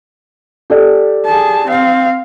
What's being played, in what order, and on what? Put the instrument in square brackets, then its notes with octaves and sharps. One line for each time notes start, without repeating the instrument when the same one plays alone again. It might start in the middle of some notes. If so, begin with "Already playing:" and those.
[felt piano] G4 A4 D5
[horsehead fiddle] G#4 A5
C4 F5